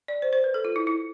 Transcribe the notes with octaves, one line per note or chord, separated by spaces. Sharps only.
D5
C5
C5
B4
A4
F4
E4
E4